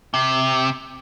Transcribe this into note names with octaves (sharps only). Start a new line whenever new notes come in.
C3